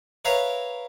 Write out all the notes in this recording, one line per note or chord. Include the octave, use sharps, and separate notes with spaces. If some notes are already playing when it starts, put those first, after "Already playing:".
A#4 B4 C#5 E5 F5 A#5